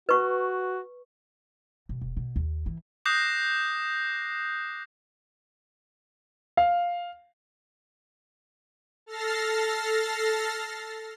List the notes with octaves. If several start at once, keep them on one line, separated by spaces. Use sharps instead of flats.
F#4 B4 C#6
B1
E1
B2
D#2
E3
D6 D#6 F#6 G6 A#6 C7
F5
A4 F6 A6 A#6 C7